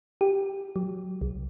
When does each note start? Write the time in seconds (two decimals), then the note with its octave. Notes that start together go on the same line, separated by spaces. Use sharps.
0.21 G4
0.76 F#3
1.21 C2